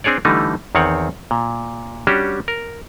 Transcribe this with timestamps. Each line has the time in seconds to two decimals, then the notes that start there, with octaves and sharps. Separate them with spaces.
0.04 C4 D4 G#4 C#5 D5
0.25 D3 E3 G3 A3 D#4
0.75 E2 D#3 C4 C#5 F#5
1.31 A#2
2.07 G3 C#4 D4 F#4 G4
2.48 A#4